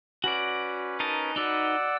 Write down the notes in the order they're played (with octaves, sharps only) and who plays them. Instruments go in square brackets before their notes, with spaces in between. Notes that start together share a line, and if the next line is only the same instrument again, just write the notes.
[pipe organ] C#4 B4 [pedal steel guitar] F#4 D5
[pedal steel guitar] D#4 A#4 A5
[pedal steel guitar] D#4 F#4 B4 [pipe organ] D5 F#5 E6